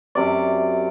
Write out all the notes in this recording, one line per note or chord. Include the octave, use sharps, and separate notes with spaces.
F#2 C3 D5